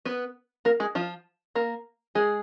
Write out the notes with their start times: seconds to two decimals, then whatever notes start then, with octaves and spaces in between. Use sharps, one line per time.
0.05 B3 B4
0.65 A#3 A#4
0.80 G#3 G#4
0.95 F3 F4
1.55 A#3 A#4
2.15 G#3 G#4